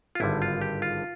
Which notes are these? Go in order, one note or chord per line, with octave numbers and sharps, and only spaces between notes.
F4
G#1 G2 D3 G3 E4
F4
G4
F4